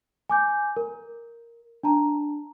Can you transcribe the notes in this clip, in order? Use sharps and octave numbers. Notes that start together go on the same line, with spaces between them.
G#5 D6 G6
A#4
D4 A5 A#5